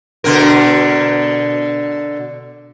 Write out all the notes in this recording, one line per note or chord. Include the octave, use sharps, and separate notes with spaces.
B2 D3 A#4